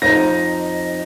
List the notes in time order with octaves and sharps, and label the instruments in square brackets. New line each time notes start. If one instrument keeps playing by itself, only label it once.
[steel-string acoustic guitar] F2 D#4 A#5 [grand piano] A#6